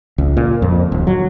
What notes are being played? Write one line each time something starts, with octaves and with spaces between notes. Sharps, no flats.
C#2
A#2
F2
D1
F#3